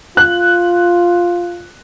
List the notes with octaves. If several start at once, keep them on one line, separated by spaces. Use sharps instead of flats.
F4 F#6